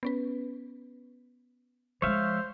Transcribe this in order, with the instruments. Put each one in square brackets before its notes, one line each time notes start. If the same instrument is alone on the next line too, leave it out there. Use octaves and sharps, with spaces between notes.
[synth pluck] B3 C#4 B4
[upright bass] F3 G#3 [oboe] C5 [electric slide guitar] C#5 E5 F5